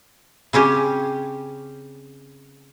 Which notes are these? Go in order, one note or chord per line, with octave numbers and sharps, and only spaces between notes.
C#3 C4 C#4 G4